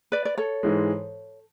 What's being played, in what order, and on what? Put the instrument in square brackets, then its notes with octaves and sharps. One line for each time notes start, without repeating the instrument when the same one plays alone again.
[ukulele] B4 D5
D5
A4 C#5
[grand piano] G#2 E3 G#3